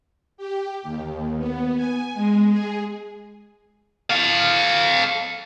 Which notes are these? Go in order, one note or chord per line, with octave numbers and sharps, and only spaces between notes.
G4
D#2
B3
G#5
G#3
G#4
A4 F5